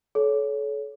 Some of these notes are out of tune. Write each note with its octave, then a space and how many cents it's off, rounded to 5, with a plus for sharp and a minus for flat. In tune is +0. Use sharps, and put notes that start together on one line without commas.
A4 -35 C#5 +20